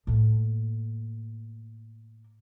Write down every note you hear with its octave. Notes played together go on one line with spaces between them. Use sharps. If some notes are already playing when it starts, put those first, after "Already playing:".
A2 A#3